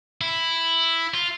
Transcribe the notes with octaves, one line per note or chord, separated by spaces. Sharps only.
E4
F4